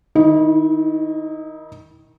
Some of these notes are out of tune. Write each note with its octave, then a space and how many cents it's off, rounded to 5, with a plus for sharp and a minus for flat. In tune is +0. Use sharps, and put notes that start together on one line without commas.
D#3 +0 E4 -30 D#5 +0